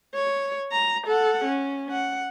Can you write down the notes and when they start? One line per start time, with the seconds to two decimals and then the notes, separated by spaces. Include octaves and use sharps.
0.15 C#5
0.72 A#5
1.06 A4 F#5
1.44 C#4
1.91 F#5